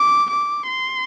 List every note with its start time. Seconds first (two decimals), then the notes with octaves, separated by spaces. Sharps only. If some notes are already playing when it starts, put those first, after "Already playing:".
Already playing: D6
0.30 D6
0.68 C6